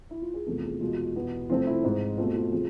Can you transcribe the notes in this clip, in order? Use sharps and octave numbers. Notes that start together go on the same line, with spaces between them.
E4
F4
G#4
E2 C3 F3 A3 A4
G#4
E2 B2 G#3 F4
E2 B2 B3
C3 F3 A3 C4 F4
E4
G#2 G#3 C4
B2 A3 C4 F4
F4
C3 F3 G#4